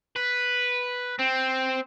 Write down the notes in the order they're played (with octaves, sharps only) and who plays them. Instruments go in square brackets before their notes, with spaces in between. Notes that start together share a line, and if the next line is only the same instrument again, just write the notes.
[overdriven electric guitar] B4
C4